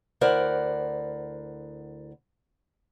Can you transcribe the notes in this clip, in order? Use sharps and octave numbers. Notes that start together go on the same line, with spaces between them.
D2 E4 A#4 C5 D5 F#5